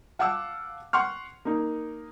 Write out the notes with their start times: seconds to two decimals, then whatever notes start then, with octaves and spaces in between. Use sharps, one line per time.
0.19 F5 F#5 A5 D6 E6
0.93 F#5 C6 C#6 F6
1.45 A#3 D#4